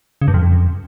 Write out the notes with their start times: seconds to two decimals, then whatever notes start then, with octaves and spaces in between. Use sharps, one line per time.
0.21 C#3
0.28 G2
0.34 F2